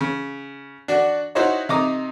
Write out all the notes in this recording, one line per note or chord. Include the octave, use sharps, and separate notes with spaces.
C#3
D4 F#4 D5
D#4 E4 F#4 C5 C#5 D#5
C3 D#4 A#5 D6 D#6